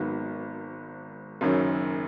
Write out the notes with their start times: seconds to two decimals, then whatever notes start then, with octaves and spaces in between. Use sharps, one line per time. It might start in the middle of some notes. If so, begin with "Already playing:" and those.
Already playing: G#1 G#2 D#3 F#3 B3
1.41 F#1 F#2 D#3 F#3 C#4